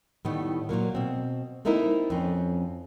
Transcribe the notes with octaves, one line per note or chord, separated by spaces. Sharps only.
A2 D#3 G3 A3 B3
A#2 F3 F#3 A#3
B2 C4
A3 A#3 C4 D#4 E4 A#4
F2 C4 C#4